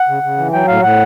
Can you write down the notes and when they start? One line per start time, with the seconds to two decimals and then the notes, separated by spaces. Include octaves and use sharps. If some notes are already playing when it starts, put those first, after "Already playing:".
Already playing: F#5
0.09 C#3
0.23 C#3
0.38 E3
0.53 F#3 G5
0.68 A2 F5
0.83 A2 F#5